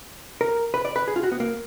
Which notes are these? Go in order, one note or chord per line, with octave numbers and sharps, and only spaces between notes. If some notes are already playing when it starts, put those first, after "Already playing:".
A#4
B4
D5
B4
G#4
F4
F#4
B3
A#3